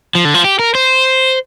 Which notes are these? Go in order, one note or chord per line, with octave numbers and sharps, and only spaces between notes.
F3
D3
F3
G4
A#4
C5